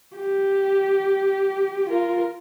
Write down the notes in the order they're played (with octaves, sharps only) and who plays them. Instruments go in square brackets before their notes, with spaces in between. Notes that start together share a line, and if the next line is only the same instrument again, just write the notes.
[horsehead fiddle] G4
F4 A#4